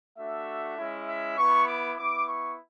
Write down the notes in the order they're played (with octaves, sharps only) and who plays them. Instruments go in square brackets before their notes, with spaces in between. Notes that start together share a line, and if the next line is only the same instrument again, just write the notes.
[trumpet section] A3 D4 F#4 E5
G#3 C#4 E4
E5
B3 E4 C#6
D6
B3 E4 D6
C#6